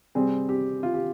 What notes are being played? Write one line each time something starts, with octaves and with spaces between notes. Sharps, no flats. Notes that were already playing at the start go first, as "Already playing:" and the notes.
C3 G3 C4 G#4
G4
F4
G4